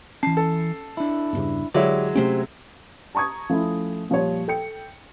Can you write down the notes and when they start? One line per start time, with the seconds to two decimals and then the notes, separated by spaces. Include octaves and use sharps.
0.23 E3 C#4 A5 C7
0.37 A4
0.97 D4 E4
1.33 E2 G2 C#3
1.74 D3 F#3 G#3 E4 G4 C#5 D5
2.15 C3 A3 C#4 G4 C5
3.15 A5 A#5 C#6 D#6 G#6
3.49 F3 A3 C#4 E4
4.09 A#2 F3 G3 C#5
4.48 A4 G5 C#7